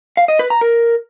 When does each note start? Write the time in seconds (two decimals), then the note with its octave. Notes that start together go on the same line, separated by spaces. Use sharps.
0.17 F5
0.28 D#5
0.39 B4
0.50 A#5
0.61 A#4